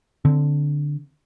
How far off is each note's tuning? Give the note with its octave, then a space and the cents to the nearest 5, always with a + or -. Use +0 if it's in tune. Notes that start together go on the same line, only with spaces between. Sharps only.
D3 +0 C4 +0